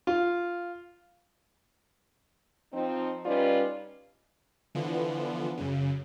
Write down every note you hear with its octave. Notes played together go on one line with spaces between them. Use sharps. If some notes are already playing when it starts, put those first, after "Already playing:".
F4
F3 C4 D#4
G3 C#4 D#4 F4 B4 D5
D3 E3 F3 B3
F#2 C#3